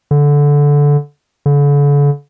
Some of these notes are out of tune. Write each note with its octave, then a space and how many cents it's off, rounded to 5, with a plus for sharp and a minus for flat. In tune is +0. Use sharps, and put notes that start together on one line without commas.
D3 -15
D3 -40